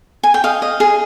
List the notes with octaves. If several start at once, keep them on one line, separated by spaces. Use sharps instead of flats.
G#5
G5
D#5 F5
D#5
G#4